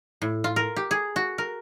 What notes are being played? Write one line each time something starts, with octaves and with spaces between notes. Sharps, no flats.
A2
F4
A#4
G4
G#4
F#4
A#4